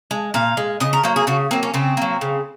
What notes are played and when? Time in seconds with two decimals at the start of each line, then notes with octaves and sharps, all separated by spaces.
0.11 G#3
0.34 A#2 F5
0.57 G#3
0.80 C#3 D#5
0.93 A#4
1.03 F#3 A#3 C5
1.16 G#4
1.27 C#3 F#4
1.51 F#3 A#3 C4
1.63 C#4
1.74 C#3 C4
1.97 F#3 A#3
2.21 C#3